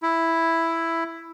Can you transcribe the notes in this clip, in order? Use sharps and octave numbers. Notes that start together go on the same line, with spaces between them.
E4